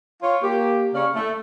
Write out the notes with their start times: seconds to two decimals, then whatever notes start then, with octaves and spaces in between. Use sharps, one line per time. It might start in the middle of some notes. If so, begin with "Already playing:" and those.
0.23 F4 C#5
0.42 A#3 G4
0.94 C#3 C#4 C#5 D5 F5
1.14 A3